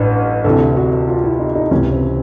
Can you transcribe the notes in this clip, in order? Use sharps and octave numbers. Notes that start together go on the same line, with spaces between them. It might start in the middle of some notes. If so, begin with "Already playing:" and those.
Already playing: A1 G2 D3
D2 C3 E3 A4
F#4
F4
E4
D#4
D#4
C#2 C3 E3 C#4
C4